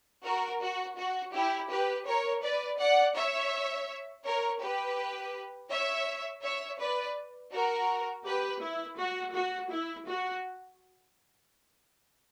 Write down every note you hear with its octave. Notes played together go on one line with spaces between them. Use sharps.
F#4 A#4
F#4
F#4
E4 G4
G4 B4
A#4 C#5
B4 D5
D5 F#5
C#5 E5
A#4 C#5
G4 B4
C#5 E5
C#5 E5
B4 D5
F#4 A#4
G4 B4
E4
F#4
F#4
E4
F#4